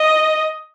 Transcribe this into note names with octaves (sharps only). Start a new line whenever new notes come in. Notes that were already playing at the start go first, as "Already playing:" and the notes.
Already playing: D#5